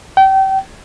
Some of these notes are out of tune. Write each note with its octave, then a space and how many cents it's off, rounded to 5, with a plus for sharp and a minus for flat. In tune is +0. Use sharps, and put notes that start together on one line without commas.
G5 -30